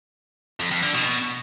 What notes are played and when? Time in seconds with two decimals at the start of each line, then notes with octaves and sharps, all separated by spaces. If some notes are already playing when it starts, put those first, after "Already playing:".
0.60 F2
0.71 F2
0.83 D3
0.94 B2